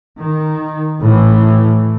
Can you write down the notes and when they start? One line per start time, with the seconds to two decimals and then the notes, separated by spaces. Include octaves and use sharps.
0.19 D#3
1.01 A2 E3